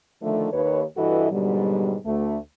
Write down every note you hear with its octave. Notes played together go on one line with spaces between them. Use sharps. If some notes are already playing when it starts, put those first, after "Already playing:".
D3 D#3 F3 A3
D#2 B4 C#5
G2 E3 E4 F#4 A4 D#5
G#2 B2 D3 F#3 G3
D2 A3